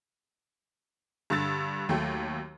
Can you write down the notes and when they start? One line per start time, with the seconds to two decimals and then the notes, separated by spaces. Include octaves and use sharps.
1.30 G2 D3 E6 A6
1.89 D#2 F#3 A3 G5